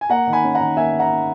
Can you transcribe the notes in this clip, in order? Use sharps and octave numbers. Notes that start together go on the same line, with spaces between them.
G#5
A#3 F#5 A#5
D#3
G#5 B5
C#4
F#5 A#5
D#3
A#3 E5 G#5
D#3
F#5 A#5
C#4